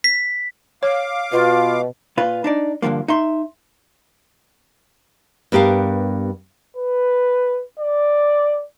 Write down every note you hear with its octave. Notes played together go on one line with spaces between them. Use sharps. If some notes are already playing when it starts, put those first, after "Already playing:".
B6
C#5 F5 D6
B2 F4
A#2 F4 B4
D4 D#4 D5
G2 A#2 D3 F3 A#3
D#4 E5 C6
G2 B3 G4 A#4 F5
B4
D5